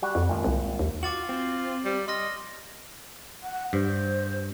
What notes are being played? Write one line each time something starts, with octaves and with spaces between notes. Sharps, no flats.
G3 F#4
F2
G#1 A#2
C2
D#2
F4 F#4 D6 A6 F#7
C4
G3
D#5 C6 F6 A#6
F#5
G2 C5